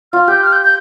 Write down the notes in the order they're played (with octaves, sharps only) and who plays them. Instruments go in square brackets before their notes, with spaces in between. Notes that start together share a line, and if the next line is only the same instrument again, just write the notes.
[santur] F4 [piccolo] F6
[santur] G4 [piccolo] G6
[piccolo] F6
G6
G6